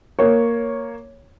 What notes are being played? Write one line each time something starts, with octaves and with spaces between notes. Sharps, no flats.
A#3 C#5